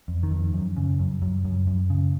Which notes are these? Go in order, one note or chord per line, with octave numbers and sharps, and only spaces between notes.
F2
D#3
F2
F#2
C#3
F#2
F#2
F#2
F#2
C#3